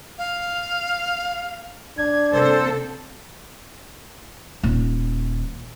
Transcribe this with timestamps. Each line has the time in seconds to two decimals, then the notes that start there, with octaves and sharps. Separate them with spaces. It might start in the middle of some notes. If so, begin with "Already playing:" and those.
0.18 F5
1.98 A#2 D4 G#6
2.32 C3 G3 A#3 C4 A4 C5
4.63 D#1